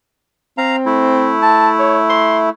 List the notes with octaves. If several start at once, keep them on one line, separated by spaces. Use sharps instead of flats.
C4 F5 A#5
A3 E4
A5
C#5
C6